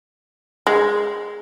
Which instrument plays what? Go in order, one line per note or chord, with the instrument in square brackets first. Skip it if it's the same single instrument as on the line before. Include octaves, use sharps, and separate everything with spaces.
[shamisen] G#3